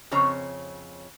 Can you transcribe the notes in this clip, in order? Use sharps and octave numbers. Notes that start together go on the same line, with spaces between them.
F2 C#3 C4 C#5 A#5